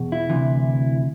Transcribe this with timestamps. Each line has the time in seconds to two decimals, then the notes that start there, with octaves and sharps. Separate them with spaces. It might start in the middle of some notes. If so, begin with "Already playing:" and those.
Already playing: E2 B2
0.12 E4
0.30 D2 C3 E3